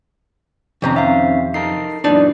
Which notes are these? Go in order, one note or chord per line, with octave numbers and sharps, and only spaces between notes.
F2 C3 D#3 C#4 C5 A#5
C4 E5 F5
D#4 A4 A#4 C7
F#2 A#2 E3 D4 D#4 D5